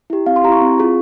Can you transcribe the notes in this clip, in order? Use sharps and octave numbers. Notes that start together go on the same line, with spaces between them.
E4 G4
C4 F5
C6
E4 G4 A#5 C#6
C4
F4 G#4